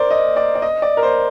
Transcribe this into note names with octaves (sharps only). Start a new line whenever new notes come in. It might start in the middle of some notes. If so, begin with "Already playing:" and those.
Already playing: A#4 C5 D5
D#5
D5
D5
D#5
D5
A#4
C5